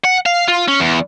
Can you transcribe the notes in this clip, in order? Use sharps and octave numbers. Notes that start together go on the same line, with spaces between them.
F#5
F5
F4
C#4
E2